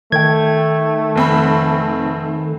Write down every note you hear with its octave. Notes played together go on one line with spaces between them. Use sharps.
D#3 A3 G5 G#6
F1 C4 B5